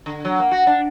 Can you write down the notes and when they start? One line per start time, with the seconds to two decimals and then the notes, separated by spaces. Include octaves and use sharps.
0.06 D3
0.25 F#3
0.39 A#3
0.51 F#4
0.67 D4